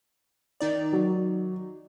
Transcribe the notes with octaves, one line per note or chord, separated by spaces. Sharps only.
D#3 D#4 D5
F#3